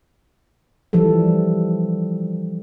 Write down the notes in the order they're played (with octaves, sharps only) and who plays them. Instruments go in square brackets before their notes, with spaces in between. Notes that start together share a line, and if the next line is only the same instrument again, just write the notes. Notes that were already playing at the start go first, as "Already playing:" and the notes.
[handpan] E3 F3 G3 A4